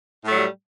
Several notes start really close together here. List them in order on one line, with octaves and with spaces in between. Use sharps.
A2 A3 F#3 G3